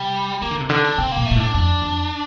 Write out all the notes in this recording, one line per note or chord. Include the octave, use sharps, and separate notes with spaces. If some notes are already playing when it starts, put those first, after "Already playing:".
Already playing: C3 G3
D#3 A#3
D3
C3
D3 D4
D4
C3 C4
A#3
A#2
A3
A#2
A2 D4
F2 D4
F2